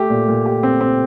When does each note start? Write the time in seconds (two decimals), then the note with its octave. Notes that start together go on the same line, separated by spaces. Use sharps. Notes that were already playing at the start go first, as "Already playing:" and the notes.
Already playing: A3 G4
0.10 A#2
0.28 A#2
0.46 G4
0.63 C4
0.81 C4